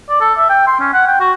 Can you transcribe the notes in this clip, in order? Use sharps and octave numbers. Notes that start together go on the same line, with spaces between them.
D5
A4
E5
G5
C6
C#4
F#5
G5
F#4